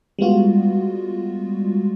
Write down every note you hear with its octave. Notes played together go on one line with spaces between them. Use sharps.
G3 G#3 B3 F4 F#4